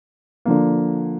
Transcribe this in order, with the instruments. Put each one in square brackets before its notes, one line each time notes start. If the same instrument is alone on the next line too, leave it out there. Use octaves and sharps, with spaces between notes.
[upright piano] D3 F3 A#3